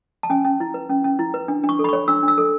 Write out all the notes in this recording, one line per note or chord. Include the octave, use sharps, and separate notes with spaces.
A5
C#4 G#5
C#4
E4
B4
C#4
C#4
E4
B4
D4
D4
C#6
A4
B5
C#5 C#6
D4 E6
D4 E6
A4